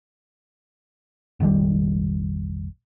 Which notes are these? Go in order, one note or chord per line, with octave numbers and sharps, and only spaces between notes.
F1 A#1 D#3 G3